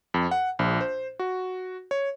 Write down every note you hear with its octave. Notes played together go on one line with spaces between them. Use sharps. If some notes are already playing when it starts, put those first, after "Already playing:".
F2
F#5
A#1
C5
F#4
C#5